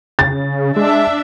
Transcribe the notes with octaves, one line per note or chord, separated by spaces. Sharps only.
C#3 A6
G#3 D4 E5